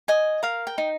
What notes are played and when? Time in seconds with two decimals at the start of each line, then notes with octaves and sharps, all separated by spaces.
0.08 D#5 G#5
0.43 A#4 F5
0.67 G5
0.78 D#4